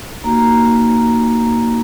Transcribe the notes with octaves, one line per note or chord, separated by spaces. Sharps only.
A#3 D#4 F#4 A#5